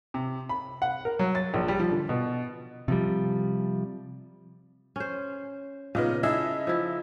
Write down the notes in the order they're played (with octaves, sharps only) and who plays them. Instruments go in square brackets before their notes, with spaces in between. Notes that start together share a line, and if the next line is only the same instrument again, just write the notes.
[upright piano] C3
B5
F#5
A#4
F#3
A6
A#1
G3
F3
D3
B2
[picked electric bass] C3 F3 G3
[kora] C#4 C5
[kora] A#2 C#3 D#5 [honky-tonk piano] B3 D#4 F4
[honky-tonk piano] D#4 E5 E6 [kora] E4 G#4 A4
[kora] F3 E4